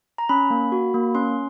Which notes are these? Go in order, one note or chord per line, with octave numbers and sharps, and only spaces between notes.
A#5
C#4 B5
A#3
F#4
A#3
C#4 C6